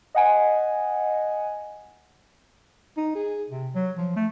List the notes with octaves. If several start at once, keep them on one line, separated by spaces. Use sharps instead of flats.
D#5 F#5 G#5
D#4
G#4
C3
F#3
F3
A3